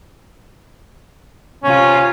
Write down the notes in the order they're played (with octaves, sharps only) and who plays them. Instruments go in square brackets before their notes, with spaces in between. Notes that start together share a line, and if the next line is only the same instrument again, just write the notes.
[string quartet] C3 F4 [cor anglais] C#4